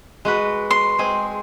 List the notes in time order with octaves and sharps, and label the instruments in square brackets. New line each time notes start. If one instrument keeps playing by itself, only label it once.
[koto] G#3 F#4 B4
[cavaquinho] C6
[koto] G#3 C4 G#4